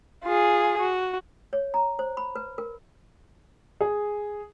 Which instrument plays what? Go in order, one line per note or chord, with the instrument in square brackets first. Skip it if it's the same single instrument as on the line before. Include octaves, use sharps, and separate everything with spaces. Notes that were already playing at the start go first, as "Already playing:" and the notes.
[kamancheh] F4 G#4
F#4
[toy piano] C#5
A#5
C5
B5
B4
A#4
[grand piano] G#4